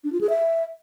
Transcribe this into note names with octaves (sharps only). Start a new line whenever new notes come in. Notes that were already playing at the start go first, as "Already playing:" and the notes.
D4
F4
G#4
E5